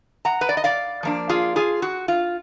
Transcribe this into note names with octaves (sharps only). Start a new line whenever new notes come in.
F#5 A#5
B4
D5
D#5
D5 F5
F3 A#3 D4
F4 G#4
F4 G#4
F#4
F4